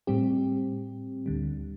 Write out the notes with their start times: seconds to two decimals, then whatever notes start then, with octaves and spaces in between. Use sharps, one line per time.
0.07 A2 G3 C4 G4
1.26 D2 D3 G3